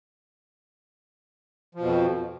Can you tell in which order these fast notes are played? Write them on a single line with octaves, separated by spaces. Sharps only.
F3 B2 F2